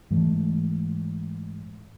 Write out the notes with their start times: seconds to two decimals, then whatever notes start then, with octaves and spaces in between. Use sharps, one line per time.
0.11 G#2 E3 A3